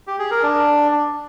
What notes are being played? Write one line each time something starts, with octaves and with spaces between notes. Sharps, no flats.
G4
G#4
A#4
D4